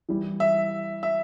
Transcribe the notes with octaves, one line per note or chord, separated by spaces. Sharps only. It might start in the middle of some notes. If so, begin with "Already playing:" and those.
E3 G3 E4
E5
E5